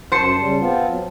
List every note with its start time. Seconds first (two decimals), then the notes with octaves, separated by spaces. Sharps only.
0.12 F#2 C5 A5 C#7
0.38 C#3 G3
0.59 B3 C4 F4
0.87 F#3